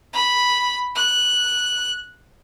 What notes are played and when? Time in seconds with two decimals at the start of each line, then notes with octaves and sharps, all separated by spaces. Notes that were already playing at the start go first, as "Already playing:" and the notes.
0.13 B5
0.95 F#6